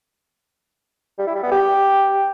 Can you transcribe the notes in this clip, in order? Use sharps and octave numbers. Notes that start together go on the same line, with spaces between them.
G3
E4
G3
B3
G4